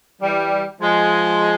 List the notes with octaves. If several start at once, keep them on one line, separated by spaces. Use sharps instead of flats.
E3 G3
F3 G#3